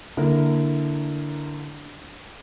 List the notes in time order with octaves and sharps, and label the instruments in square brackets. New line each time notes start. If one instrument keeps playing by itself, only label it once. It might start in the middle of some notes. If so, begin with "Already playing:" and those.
[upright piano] D3 A#3 E4 A#4